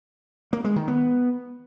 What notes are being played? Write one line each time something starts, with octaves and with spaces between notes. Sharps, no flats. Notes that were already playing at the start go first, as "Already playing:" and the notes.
A#3
G#3
D#3
B3